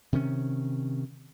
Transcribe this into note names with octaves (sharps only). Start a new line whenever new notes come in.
C3 D#3 C#4